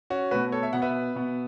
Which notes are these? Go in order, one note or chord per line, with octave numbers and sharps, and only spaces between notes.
C#4 F#4
B2 A3 F#4 B4
A4 C#5
E5
B2 B3 F#5
B4 E5
B2 B3